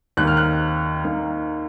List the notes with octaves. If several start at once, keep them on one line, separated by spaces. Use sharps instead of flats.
D#2 D#3 A#3 F#6
F6
F#6
D#2 D#3 A#3